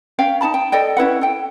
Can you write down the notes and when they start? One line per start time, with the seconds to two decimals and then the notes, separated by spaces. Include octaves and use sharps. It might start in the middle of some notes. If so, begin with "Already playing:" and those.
0.19 C#4 F5 G5
0.41 D#4 G#4 A5 B5
0.54 G5
0.72 A4 D5 D#5 G5
0.97 C#4 E4 B4 F#5
1.21 A4 G5